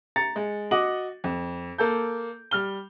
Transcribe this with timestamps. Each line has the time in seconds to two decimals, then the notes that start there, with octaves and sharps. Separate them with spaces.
0.16 A#5 A6 C#7
0.36 G#3
0.71 F#4 D#5 D6 F#7
1.24 F2
1.78 A#3 A4 G6
2.51 G3 F6 G7